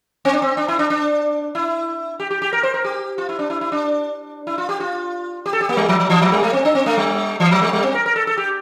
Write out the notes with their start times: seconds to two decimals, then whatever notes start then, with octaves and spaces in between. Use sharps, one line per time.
0.25 C4
0.33 D4
0.42 C4
0.57 D4
0.68 E4
0.79 D4
0.90 D4
1.55 E4
2.20 G4
2.31 G4
2.42 G4
2.53 A#4
2.63 C5
2.74 A#4
2.84 G4
3.18 F4
3.29 E4
3.39 D4
3.50 E4
3.61 E4
3.72 D4
4.47 E4
4.58 F4
4.69 G4
4.80 F4
5.46 G4
5.53 A4
5.61 G4
5.69 A#3
5.77 G3
5.89 F3
6.00 F3
6.10 E3
6.21 F3
6.32 G3
6.43 A3
6.53 C4
6.65 D4
6.75 C4
6.86 A3
6.97 G3
7.40 E3
7.51 F3
7.62 G3
7.73 G3
7.83 C4
7.94 A#4
8.06 A#4
8.16 A4
8.27 A4
8.37 G4